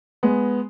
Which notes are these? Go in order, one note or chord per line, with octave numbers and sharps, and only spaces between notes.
G#3 B3